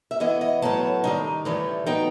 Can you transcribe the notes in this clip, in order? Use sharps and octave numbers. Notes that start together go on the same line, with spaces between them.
E5
E3 B3 E4 D#5
D#5
A2 F#3 B3 A5
D#3 G3 D#4
A2 E3 G3
F#3 B3 D#4 G5